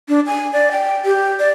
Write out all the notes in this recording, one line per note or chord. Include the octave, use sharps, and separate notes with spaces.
D4
G#5
D5
G5
G4
D5